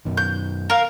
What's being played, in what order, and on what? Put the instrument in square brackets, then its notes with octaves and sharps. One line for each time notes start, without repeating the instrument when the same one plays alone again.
[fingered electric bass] F#2 B2 D#3
[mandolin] G6
A#4 F5